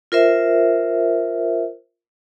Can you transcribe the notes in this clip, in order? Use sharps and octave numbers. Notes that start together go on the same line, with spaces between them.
F4 A#4 C5 E5